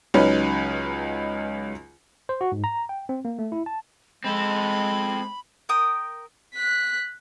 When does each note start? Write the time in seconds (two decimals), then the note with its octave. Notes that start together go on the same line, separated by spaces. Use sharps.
0.14 C#2 F#3 C#4 D#4 B4
2.29 C5
2.41 F#4
2.52 G#2
2.64 A#5
2.89 G5
3.09 C4
3.25 A#3
3.39 A3
3.52 E4
3.66 A5
4.24 G#3 C4 A4 B5
5.69 A#4 G5 D#6
6.55 F#6 B6